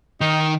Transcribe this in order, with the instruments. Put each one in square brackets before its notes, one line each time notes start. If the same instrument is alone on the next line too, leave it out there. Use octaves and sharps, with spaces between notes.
[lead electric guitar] D#3 [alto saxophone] D#4